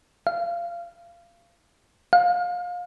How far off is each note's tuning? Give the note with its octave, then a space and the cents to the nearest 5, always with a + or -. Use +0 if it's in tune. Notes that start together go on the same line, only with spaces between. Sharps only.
F5 -25
F5 +30